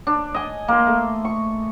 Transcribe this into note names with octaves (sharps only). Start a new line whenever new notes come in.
D4
D#5 G#5
A#3 C6
A3
C#6